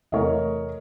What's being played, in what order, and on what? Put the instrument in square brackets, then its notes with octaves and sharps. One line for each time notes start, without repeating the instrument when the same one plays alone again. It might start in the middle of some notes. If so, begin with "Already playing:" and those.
[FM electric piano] E2 C3 A3 [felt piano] A#4 C#5 D#5